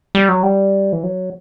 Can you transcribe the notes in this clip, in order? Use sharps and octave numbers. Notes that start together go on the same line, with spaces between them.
G3
F#3
G3
E3
F#3